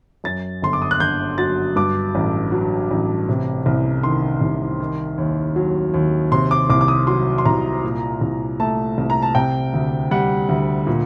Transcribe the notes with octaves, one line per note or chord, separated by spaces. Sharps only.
F#2 A6
G1 C6
D6
D#6
F#6
D3 G6
F#3 A6
G2 D6
A1
F#3
A1
C3
C2
D#3 C6
C2
D#3
D#2
F#3
D#2
C3 C6
D6
C2 D6
D6
D#6
F#3 C6
C6
C2 A#5
A#2
C2
A3 A5
C2
A#5
A5
C3 G5
D2
G3 F#5
D2
A#2